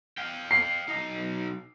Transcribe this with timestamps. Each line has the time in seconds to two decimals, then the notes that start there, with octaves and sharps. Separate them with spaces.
0.18 F5 G5
0.51 C7
0.88 B1 D#4